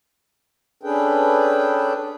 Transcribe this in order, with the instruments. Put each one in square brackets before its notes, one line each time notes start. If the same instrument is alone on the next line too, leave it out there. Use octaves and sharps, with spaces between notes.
[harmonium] C#4 D4 G#4 A4 B4 G5